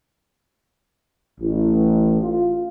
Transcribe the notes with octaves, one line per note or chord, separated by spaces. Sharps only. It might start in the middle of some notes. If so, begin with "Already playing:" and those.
A1
F4